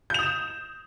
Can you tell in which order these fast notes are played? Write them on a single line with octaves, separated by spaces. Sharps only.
G6 F7 D#6 E7